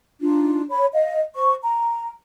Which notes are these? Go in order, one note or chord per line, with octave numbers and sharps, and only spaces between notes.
D4 D#4 F4
C#5 B5
D#5 F5
C5 C#6
A#5